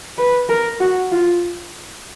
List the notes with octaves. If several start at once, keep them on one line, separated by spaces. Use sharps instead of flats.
B4
A#4
F#4
F4